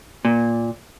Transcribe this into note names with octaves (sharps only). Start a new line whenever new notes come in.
A#2